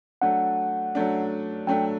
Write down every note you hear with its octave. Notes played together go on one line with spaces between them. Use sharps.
F#3 A3 D4 F#5
F#3 A3 D4
F#3 A3 D4 G5